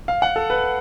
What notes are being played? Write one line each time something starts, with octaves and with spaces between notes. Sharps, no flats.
F5
F#5
A4
B4